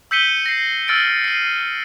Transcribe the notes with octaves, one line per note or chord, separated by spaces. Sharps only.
E6 G6 B6 C#7 D#7 G7
A#6 C7
E6 F6 A6 C#7 D7
C7 D#7